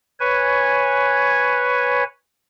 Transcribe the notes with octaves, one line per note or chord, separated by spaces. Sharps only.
B4 C#5 G#5